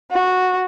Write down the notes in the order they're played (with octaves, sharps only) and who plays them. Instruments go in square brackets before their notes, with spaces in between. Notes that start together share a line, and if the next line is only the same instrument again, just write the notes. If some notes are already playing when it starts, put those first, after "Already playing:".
[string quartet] F#4